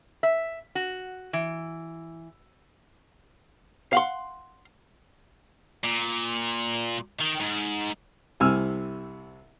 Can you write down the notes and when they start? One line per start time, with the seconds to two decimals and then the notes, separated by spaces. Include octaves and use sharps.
0.23 E5
0.75 F#4
1.33 E3
3.93 F5 F#5 C6
5.83 A#2
7.20 D#3
7.40 G#2
8.40 C2 C3 G#5 E6 F6